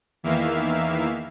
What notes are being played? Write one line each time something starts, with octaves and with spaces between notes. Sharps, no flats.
E2 D#3 E3 A#3 E5 F5